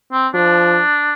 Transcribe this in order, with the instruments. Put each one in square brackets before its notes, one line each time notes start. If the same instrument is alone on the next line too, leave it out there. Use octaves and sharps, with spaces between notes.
[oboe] C4
[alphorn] F3 [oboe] D4